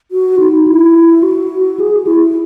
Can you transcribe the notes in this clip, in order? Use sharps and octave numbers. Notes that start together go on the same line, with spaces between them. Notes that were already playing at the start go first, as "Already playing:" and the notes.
F#4
D#4
E4
F#4
G#4
E4